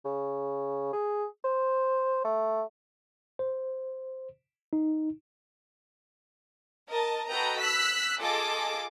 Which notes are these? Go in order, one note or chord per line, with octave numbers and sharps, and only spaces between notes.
C#3
G#4
C5
A3
C5
D#4
A#4 D#5 A5
F#4 A4 B4 D#5 G5 A#5
E6 F#6 B6
F4 G#4 A4 D#5 A5 D6